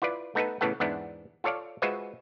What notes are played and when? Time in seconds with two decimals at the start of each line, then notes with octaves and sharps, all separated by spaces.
0.02 E4 F4 B4 D5
0.35 A3 B3 D#4 A4 B4
0.61 A2 C#3 E3 B3 A4 F#5
0.80 E2 G#2 B3 D4 E4
1.44 F4 A4 C#5 D5 F5
1.82 G#3 F4 F#4 B4 C5 E5